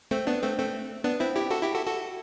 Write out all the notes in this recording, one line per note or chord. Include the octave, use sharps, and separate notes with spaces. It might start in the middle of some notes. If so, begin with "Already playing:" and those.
A3 C4
B3 D4
A3 C4
A3 C4
B3 D4
C4 E4
E4 G4
F#4 A4
E4 G4
F#4 A4
F#4 A4